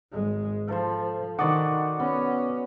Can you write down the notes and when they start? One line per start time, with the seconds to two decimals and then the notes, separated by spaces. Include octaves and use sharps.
0.13 G#1 G#3
0.68 F3 A4 C5
1.39 D#3 F#4 D5 F#5 C6 D6 D#6
2.00 B3 C#4